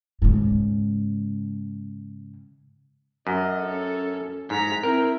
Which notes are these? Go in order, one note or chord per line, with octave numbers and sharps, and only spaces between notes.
G#2 C#3
F#2 D#5
C#4 A4
G#2 A#5 B6
C4 E4 A#4